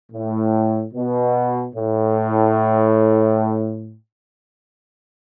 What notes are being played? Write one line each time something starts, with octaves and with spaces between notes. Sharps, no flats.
A2
B2
A2